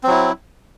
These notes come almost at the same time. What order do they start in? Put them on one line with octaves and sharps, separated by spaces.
C4 F#3 E4